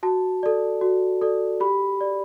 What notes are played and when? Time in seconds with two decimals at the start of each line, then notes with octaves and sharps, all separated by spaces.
0.03 F#4 A5
0.43 A4 D5
0.81 F#4
1.22 A4 D5
1.60 G4 B5
2.01 D5